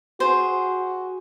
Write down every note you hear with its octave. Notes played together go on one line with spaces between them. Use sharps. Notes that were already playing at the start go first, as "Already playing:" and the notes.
F#4 G#4 C5